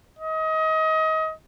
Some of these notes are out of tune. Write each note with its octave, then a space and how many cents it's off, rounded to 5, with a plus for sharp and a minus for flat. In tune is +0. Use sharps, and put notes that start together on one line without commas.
D#5 +30